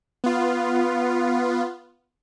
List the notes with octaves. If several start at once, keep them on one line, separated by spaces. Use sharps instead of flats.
B3 F4